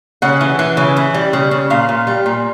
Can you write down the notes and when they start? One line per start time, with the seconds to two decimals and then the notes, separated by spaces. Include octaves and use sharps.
0.22 C#3 F#5
0.41 E3
0.59 E3
0.77 C#3
0.97 E3
1.14 G3
1.33 C#3
1.51 C#3
1.70 A#2 F5
1.89 A#2
2.07 G3
2.26 A#2